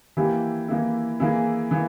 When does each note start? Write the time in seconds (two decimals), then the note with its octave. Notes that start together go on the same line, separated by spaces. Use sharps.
0.17 E3 A#3 E4 G4
0.68 E3 A#3 E4
1.20 E3 A#3 E4 G#4
1.71 E3 A#3